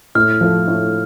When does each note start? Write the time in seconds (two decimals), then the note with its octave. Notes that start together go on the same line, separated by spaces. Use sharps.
0.15 A2 F6
0.41 F3 A3
0.67 A2